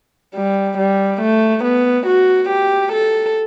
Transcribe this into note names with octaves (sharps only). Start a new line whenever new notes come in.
G3
G3
A3
B3
F#4
G4
A4